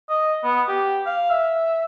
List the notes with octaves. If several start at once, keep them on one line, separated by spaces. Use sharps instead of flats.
D#5
B3
G4
F5
E5